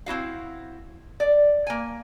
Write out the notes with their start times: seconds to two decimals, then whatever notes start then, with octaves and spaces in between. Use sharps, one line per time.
0.06 C4 E4 F#4 F5
1.20 D5
1.67 A#3 G#5